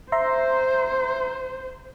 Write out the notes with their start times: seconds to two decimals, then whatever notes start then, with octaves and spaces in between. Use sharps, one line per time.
0.12 C5 E5 A#5 C6